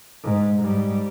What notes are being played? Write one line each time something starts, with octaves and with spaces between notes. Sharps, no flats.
G#2
G#2 G3